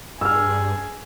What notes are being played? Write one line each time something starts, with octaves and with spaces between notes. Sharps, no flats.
G2 G#4 E6 F6